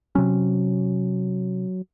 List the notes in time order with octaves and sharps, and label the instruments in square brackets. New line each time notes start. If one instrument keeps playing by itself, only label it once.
[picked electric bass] C3 C#4 [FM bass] F#3